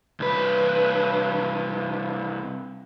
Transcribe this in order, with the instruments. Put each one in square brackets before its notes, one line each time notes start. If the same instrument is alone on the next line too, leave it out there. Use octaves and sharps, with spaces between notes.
[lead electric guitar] C2 B4